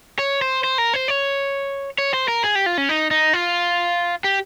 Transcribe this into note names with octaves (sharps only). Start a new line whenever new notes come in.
C#5
C5
C5
A#4
C5
C#5
C#5
C5
A#4
G#4
G4
F4
C#4
D#4
D#4
F4
G4